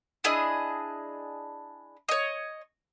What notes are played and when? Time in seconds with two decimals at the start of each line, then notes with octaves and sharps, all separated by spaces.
0.24 D4 E4 G#4 D#5
2.09 C#5 D#5